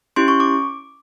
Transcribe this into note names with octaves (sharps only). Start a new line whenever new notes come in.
C#4 E4 G4 C6
C#6
D6